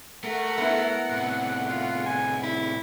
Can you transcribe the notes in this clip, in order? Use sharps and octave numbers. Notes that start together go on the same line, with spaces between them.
A3 A#4 F#5
B3 E4
A2 C3
F4
G#5
E4